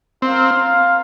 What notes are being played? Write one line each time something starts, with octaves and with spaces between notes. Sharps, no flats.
C4 F4 A#4 F5